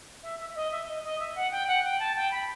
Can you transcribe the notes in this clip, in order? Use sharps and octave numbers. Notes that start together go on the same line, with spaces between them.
E5
E5
E5
D#5
E5
D#5
D#5
E5
F#5
G5
F#5
G5
A5
G5
B5